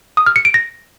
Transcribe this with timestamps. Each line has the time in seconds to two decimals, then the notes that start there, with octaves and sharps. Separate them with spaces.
0.17 D#6
0.26 F6
0.36 C#7
0.45 D7
0.54 A#6